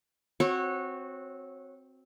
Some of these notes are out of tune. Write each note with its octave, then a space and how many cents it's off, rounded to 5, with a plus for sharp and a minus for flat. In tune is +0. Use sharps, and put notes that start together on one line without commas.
C4 +0 F#4 -10 C#5 -25